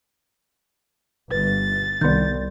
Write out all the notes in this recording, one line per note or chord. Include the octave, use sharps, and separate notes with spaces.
G1 B4 A6
C2 D#3 B3 D5 C6 G6